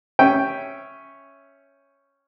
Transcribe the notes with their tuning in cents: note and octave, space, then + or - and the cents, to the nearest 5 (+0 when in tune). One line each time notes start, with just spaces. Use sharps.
C#4 +0 E5 +0 G5 +0